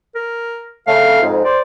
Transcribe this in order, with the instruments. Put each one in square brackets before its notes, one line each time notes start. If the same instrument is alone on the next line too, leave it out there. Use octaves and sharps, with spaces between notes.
[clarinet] A#4
[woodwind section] C#3 A3 [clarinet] F5
[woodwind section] F2 G#2
[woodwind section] C5 [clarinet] D5